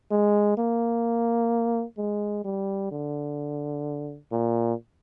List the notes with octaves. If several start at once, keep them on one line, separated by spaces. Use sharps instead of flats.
G#3
A#3
G#3
G3
D3
A#2